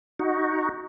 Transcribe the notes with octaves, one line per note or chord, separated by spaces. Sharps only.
D#4 F#4